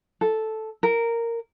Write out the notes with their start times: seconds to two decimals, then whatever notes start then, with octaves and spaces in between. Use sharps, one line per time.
0.21 A4
0.83 A#4